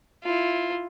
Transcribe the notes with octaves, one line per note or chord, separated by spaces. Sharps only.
E4 F4